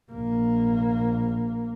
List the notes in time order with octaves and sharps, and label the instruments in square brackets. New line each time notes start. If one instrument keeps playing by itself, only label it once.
[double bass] A#1 A#3